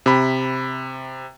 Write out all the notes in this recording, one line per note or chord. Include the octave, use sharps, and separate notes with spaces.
C3 B5